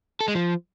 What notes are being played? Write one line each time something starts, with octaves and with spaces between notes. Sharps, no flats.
A4
G#3
F3